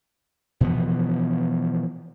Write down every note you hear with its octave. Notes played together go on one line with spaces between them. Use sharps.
B2 E3 F3 B3